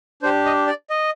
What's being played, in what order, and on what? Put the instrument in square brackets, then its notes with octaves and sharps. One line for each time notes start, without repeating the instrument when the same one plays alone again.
[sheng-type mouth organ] D4 C5
G4
D#5
D5
D#5